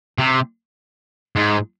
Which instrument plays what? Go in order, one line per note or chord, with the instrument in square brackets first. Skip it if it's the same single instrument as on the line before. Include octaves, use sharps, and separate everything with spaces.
[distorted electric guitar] C3
G#2